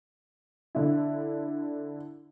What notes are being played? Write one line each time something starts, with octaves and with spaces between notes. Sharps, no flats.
D3 E4